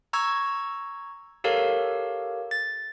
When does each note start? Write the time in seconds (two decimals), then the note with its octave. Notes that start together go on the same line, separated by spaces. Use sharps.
0.13 A#5 C#6 E6 G#6
1.44 G4 A4 A#4 C#5 F5
2.51 A6